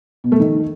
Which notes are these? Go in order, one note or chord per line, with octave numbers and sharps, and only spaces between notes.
B2
A3
D#3